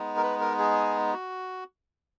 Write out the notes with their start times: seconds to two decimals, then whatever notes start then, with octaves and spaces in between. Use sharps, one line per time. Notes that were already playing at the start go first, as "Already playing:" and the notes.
Already playing: G#3 B3 D#4
0.17 A#4
0.23 B4
0.40 A#4
0.59 G#4
1.13 F#4